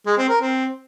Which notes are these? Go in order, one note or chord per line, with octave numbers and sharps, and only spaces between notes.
G#3
C4
A#4
C4